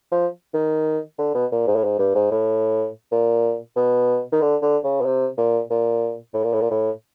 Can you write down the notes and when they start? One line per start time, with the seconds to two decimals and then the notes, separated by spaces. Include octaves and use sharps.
0.12 F3
0.54 D#3
1.19 D3
1.35 B2
1.52 A#2
1.67 G#2
1.76 A2
1.84 G#2
1.99 G2
2.15 G#2
2.32 A2
3.12 A#2
3.76 B2
4.33 D#3
4.42 D3
4.62 D3
4.84 C#3
5.01 B2
5.05 C3
5.38 A#2
5.70 A#2
6.34 A2
6.44 A#2
6.53 A2
6.61 A#2
6.71 A2